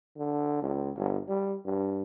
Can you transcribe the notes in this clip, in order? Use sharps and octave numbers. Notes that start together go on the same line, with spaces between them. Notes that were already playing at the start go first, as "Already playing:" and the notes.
D3
C#2
G1
G3
G2